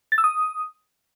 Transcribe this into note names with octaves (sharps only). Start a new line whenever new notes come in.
A6
E6
D#6